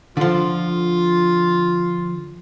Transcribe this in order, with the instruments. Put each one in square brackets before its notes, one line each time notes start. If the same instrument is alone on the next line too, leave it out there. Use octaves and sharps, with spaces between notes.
[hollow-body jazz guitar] D3 F3 [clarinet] F4